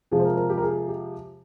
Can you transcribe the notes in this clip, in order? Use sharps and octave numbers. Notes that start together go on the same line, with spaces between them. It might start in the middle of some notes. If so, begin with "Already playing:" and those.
C3 F3 G#3 G#4
C5
A#4
A#4
G4
A#4
G#4
G4